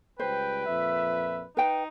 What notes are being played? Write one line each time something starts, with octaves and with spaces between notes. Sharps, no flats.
C#2 G3 B4 C5 G5
F2 A#2 E5
D#4 B4 G5